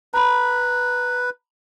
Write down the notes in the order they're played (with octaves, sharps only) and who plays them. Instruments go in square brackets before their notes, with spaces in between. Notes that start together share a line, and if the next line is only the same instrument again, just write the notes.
[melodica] B4 [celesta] A#5 B5